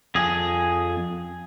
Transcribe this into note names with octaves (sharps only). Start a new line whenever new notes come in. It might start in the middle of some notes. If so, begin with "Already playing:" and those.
F2 G#4